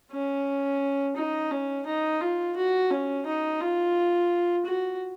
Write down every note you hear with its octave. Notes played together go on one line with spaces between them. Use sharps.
C#4
D#4
C#4
D#4
F4
F#4
C#4
D#4
F4
F#4